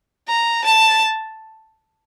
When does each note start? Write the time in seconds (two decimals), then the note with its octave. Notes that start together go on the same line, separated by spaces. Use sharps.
0.28 A#5
0.64 A5